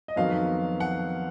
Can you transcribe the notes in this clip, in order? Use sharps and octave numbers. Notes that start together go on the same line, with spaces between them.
D#5
F2 D#3 F#3 B3 F5
F#5